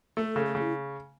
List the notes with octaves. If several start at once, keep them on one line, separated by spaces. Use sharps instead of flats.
A3 A4
C#3
A4
C#3
E4